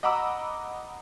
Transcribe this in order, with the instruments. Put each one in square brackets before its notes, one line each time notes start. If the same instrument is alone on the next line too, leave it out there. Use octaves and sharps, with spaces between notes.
[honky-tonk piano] D#5 F#5 A#5 B5 D6 E6